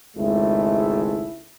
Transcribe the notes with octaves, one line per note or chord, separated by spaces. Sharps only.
G#1 C#2 G#3 A3 E4